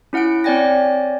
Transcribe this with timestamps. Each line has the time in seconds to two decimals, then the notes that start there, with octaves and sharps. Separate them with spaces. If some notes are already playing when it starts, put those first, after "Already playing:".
0.13 C#4 E4 F#5 F#6 D7
0.44 C4 C#5 D5 G5 G#5 A#6